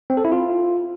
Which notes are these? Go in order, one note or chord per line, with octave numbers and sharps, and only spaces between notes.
C4
A4
E4
F4